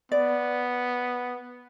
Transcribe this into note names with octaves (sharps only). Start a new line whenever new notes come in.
B3 D5